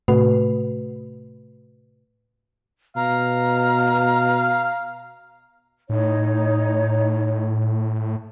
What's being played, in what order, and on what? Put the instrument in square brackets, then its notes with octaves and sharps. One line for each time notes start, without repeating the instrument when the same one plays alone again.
[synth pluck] A2 C3 A3 F#4 B4
[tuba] B2 [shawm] F5 [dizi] A#5
[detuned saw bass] A2 [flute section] D#4 C#5